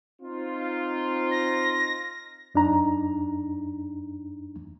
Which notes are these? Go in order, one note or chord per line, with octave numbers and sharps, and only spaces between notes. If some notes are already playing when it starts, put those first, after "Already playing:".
C4 D#4 F4
A#6
F#2 D4 D#4 A#5